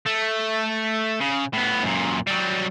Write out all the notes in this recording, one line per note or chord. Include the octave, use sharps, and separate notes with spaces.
A3
C#3
A2 B3
F#2 A#2
F#3 G3